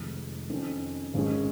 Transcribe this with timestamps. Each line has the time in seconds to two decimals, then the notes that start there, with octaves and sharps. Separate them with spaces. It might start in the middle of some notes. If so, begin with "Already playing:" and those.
Already playing: F1 F2 D#3 G#3
0.50 F2 D#3 C#4
1.14 G#1 G#2 G#3 C#4 G#4